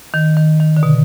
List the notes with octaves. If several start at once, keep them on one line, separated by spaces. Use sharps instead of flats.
D#3
D#3
D#3
D3
B2